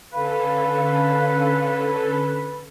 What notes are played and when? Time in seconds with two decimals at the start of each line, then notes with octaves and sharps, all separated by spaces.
0.13 D3 C#4 A4 B4 F5